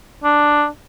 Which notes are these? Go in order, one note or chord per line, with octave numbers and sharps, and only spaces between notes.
D4